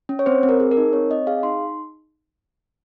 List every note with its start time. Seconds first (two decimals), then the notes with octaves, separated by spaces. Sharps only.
0.09 C#4
0.19 C#5
0.26 C4 C5
0.43 C4
0.49 A#4
0.60 G#4
0.71 A#4
0.77 D#4
0.93 C4 C#5
1.10 C4 D#5
1.27 G#4 F5
1.43 D#4 C6